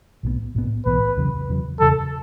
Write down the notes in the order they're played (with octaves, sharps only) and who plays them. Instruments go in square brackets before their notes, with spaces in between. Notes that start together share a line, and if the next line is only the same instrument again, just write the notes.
[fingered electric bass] B1 A2 E3 B3
B1 A2 E3 B3
[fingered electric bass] B1 A2 E3 B3 [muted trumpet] B4
[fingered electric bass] E2 C#3 F#3
E2 C#3 F#3
[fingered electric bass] E2 C#3 F#3 [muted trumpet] A4